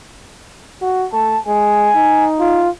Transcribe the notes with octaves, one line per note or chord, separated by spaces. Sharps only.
F#4
A3 A5
G#3 G#5
D#4
F4